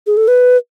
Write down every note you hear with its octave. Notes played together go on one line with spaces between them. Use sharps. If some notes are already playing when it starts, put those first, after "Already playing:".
G#4
A4
B4